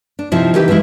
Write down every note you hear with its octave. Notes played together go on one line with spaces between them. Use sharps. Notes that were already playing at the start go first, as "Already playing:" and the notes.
D4
C3 F3 D#4 E4
D#3 E3 D#4 G4 B4
E3 F3 G3 G#3 E4